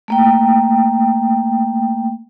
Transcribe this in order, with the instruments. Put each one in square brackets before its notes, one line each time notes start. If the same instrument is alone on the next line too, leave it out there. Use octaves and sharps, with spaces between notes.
[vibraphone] A3 A#3 G5